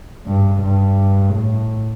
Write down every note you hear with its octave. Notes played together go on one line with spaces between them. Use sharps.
G2
G2
A2